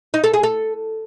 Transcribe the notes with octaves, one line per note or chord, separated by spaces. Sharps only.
D#4
A4
G#4
A4